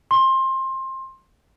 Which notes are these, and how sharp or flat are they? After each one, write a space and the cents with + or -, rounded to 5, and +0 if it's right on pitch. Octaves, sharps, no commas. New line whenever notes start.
C6 +20